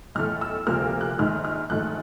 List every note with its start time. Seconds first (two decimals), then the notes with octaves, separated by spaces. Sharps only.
0.15 B1 A2 E3 A3 F6
0.41 E6
0.67 D2 C3 F3 A#3 F6
1.01 F#6
1.18 A#1 G#2 D#3 F6
1.45 F6
1.70 A#1 G#2 D#3 F#3 A3 F#6